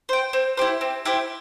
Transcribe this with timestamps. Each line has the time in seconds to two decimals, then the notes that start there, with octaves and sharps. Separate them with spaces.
0.09 C5 G5
0.33 C4
0.57 E4 G4 C5
0.81 C4
1.05 E4 G4 C5